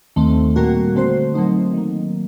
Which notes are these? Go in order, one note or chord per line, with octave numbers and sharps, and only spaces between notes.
D#2 D#3 A3 C4
A#2 G3 A#3 F#4
D3 A3 C4 F#4 C5
A#2 F#3 A3 C4 D#4
D#3 F#3 A#3